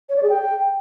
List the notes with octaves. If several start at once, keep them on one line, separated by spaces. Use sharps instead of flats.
C#5
D5
G#4
G5